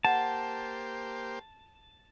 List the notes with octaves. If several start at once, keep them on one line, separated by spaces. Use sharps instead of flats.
A#3 G4 C5 F#5 A5